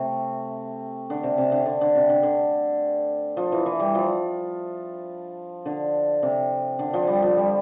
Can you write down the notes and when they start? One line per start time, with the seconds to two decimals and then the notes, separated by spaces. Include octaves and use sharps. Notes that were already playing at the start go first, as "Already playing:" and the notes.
Already playing: C3 A3
1.10 D3
1.23 C3
1.38 C3
1.52 D3
1.66 D3
1.81 D3
1.95 C3
2.09 D3
2.23 D3
3.37 F3
3.52 E3
3.66 E3
3.80 G3
3.95 F3
5.65 D3
6.23 C3
6.79 D3
6.94 F3
7.07 G3
7.22 F3
7.37 G3